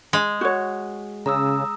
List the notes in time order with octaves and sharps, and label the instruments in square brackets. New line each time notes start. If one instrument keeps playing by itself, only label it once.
[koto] G#3
[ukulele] F#4 C#5
[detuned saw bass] C#3 [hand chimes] A#5 D#6 E6